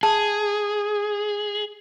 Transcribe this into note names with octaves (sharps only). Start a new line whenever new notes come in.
G#4 A5